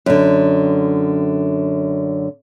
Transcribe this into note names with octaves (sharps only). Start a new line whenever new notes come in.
F#2 D3